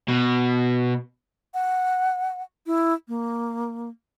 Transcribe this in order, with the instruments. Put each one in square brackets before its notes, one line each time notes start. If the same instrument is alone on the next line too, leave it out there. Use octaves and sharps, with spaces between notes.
[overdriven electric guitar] B2
[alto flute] F#5
E4
A#3